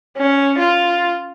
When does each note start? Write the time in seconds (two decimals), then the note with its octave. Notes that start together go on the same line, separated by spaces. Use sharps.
0.18 C#4
0.58 F4